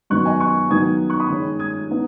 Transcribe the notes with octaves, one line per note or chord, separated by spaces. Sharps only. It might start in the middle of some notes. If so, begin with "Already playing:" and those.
F#2 D#3 B3 C#6 F#6
D#5 G#5
C#6 F#6
F#2 D#3 B3 D#4 D#6 G#6
C#6 F#6
B5 D#6
D#3 G#3 C#4
D#6 G#6
B3 D#4